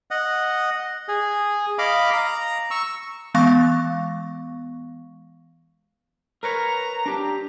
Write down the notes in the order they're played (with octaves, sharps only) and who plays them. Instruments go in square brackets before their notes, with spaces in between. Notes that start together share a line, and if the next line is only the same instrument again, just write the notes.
[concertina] D#5 F#5
G#4
D#5 F5 B5 D6
A#5
C#6 E6
[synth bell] E3 G#3 B3 F5 C#6 A#6
[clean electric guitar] A#4 B4 C#5 [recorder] A#5
[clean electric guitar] D4 G4